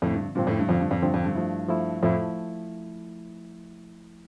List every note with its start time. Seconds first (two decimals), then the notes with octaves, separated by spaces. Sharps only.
0.02 F2 A2 D3 F3 C4
0.14 G2
0.35 G2 A#2 D3 F3 C4
0.47 F2 A2
0.59 G2
0.69 F2 D3 F3 C4
0.80 G2
0.91 F2
1.02 G2 D3 F3 C4
1.14 F2
1.25 G2
1.35 F3 A3 E4
1.69 F3 A3 E4
2.03 F2 A2 F3 A3 E4